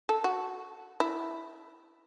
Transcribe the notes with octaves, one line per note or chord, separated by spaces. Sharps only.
A4
F#4
E4